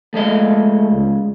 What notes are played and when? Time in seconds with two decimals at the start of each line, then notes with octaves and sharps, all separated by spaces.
0.14 F3 G#3 A3 D#5
0.91 C#2